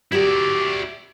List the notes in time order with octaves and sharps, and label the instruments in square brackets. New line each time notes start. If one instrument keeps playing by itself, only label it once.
[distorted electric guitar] E4 D5 [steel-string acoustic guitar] F#4 G4 A#4